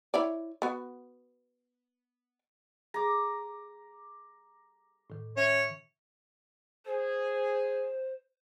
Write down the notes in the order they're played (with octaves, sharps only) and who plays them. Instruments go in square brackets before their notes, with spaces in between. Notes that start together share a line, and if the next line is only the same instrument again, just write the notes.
[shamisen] E4 C#5 D5
B3 F#4
[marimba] G#4 [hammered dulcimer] A#5 D6
[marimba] A2 D#3
[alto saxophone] C#4 [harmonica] C#5 [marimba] E5
[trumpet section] G#4 [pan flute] C5